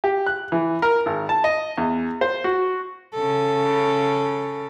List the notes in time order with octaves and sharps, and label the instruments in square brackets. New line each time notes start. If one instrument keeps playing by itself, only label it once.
[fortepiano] G4
F#6
E3
A#4
G#1
A5
D#5
E2
C5
F#4
[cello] C#3 A4